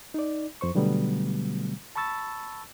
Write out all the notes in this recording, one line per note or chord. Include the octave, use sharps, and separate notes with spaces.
D#4 D5
F2 C5 C#6
B2 D3 F#3 G3 A3 B3
A5 B5 C#6 E6 A6